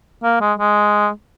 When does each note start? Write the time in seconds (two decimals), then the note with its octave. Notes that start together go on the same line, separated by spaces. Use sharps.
0.23 A#3
0.41 G#3
0.59 G#3